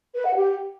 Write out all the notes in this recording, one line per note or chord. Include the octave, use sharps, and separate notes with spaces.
B4
F#5
G4